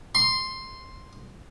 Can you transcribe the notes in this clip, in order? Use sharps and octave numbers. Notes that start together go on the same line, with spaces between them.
C6